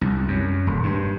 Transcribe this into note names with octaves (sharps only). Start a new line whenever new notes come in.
C2
F#2
D#1
G2